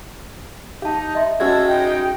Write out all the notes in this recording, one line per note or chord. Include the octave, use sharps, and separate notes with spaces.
D#4 G4 F5 A5
D#5 E5 C6
G#3 C#4 F#4 A4 E6 G#6
D#4 G5